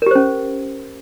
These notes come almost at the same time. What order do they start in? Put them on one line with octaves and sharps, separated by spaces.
A#4 G4 C5 C#4